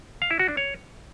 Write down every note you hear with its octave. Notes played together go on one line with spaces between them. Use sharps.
F5
E4
F#4
D4
C#5